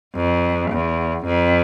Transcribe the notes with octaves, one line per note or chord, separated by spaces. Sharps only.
F2
E2
F2